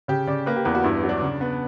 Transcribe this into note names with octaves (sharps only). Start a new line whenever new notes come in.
C#3 G4
C#3 D5
A#3 B4
G4
E2 B4
F#4
G2 E4
F#3
D4
C#3
B3